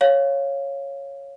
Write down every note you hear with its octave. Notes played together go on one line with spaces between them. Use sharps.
C#5 F5